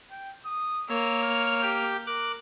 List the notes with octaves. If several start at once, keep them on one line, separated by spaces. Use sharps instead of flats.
G5
D#6
A#3 C#5 E6
F6
G4 G5
A#4 D6 F#6